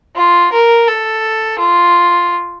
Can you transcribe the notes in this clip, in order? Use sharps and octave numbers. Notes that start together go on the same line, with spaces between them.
F4
A#4
A4
F4